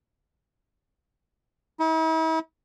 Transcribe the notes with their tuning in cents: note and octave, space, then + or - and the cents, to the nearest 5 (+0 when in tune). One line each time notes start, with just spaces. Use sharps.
E4 -45